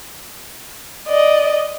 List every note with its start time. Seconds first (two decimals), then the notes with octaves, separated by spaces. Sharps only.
1.06 D5 D#5